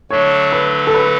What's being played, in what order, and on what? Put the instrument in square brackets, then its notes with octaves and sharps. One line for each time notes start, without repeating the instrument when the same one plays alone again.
[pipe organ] D3 F#3 A3 D4 [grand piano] C#5
[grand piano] B4
A4
B4